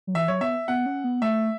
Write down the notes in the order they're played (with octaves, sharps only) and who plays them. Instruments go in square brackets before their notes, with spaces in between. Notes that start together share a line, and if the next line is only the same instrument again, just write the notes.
[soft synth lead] F#3
[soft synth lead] E3 [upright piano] E5
[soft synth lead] F#3 [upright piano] C#5
[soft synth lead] B3 [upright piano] E5
[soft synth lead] B3 [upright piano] F#5
[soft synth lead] C#4
B3
[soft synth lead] A3 [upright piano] E5